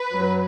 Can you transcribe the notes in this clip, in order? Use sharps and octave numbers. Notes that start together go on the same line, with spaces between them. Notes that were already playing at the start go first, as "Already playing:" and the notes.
Already playing: B4
F#2 F#3